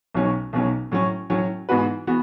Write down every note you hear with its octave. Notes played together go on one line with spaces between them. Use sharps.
B1 B2 F#3 C#4
B1 B2 F#3 C#4
A2 F#3 C#4
A2 F#3 C#4
G#2 E3 B3 F#4 B4
E3 B3 F#4